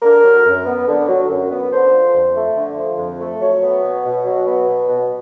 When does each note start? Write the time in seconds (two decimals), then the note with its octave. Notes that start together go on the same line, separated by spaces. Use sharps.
0.02 D3 A#4
0.24 F#3
0.46 F#2
0.66 B3
0.88 D3
1.08 F#3
1.29 F#2
1.50 B3
1.71 D3 C5
1.92 F3
2.14 F2
2.35 A3
2.56 D3
2.76 F3
2.98 F2
3.20 A3
3.40 F#3 C#5
3.62 B3
3.82 B2
4.04 B2
4.24 F#3
4.45 B3
4.66 B2
4.88 B2